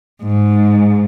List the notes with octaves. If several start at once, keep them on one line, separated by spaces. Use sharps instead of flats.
G#2